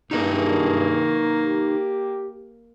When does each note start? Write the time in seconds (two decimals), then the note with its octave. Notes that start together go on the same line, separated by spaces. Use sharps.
0.11 G2 A#3 D#4 G#4 A#4 B4
1.45 G4